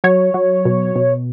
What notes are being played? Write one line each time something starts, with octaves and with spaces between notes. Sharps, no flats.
F#3 C#5
F#3
B2
B2